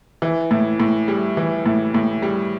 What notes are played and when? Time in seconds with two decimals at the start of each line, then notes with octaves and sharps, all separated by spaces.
0.22 E3
0.51 A2
0.80 A2
1.08 G3
1.37 E3
1.66 A2
1.94 A2
2.22 G3